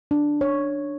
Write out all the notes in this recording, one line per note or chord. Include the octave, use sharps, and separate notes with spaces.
D4
C#5